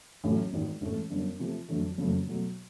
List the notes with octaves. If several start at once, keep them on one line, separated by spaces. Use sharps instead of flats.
A1 A2 F#3 A3
G#1 G#2 D#3
A1 G#2 E3 A3
G1 F#2 D3
C3 F3 A3
F2 D3 F#3 A3
F#1 F2 C#3 F#3 A3
B2 F#3 A3